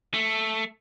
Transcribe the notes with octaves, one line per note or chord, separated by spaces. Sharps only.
A3